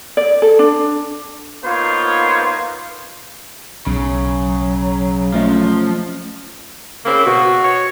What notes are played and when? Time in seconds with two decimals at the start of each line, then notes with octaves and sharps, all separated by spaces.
0.17 D5
0.42 A4
0.59 D4
1.64 A#3 B3 D#4 F4 C5 C#5
3.87 B1 C#3 F#3
5.34 F3 A3 C#4 D#5
7.06 C#3 A#3 C4 E4
7.26 B2 F#4
7.64 C#5